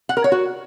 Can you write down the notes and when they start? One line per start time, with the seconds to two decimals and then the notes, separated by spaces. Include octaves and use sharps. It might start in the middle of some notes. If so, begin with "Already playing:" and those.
0.09 F#5
0.17 A#4
0.24 C#5
0.32 F#4